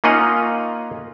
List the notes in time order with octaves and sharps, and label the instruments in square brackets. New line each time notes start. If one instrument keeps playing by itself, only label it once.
[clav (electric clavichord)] A#3 C#4 D#4 F4 D#5 F#5